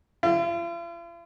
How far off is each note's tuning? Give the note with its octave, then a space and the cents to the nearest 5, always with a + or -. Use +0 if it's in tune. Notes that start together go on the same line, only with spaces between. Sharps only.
F4 -45